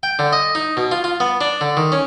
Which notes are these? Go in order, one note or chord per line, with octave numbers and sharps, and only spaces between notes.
G5
D3
D#5
D#4
B2
F4
F4
B3
D4
D3
D#3
C#4